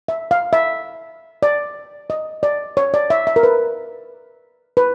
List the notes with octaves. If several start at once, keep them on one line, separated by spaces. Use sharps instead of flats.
E5
F5
E5
D5
D#5
D5
C#5
D5
E5
E5
A#4
B4
B4